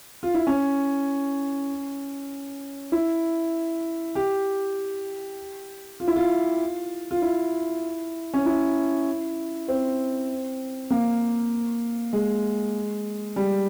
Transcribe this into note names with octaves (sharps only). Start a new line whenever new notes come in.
F4
E4
C#4
E4
G4
F4
E4
F4
F4
E4
C#4
E4
C4
A#3
G#3
G3